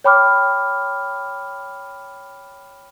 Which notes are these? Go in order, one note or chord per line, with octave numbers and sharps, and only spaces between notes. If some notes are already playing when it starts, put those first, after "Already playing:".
C#5 G5 B5 D6 F6